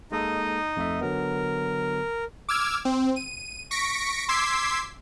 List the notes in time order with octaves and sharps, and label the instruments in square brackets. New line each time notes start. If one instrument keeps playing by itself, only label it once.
[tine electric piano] G#3 A#3 A4 [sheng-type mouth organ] D#4 D#5
[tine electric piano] F2 A3 E5
[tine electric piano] D3 F#3 B3 [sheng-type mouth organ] A#4
[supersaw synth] D6 E6 F6 G#6
C4
D#7
C#6 A#6 B6 C#7 D7
C6 D6 E6 G#6 B6 C7